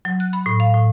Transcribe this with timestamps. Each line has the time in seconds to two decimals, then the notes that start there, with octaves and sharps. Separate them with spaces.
0.05 F#3
0.20 F#6
0.33 B5
0.46 A2
0.60 F5
0.74 A2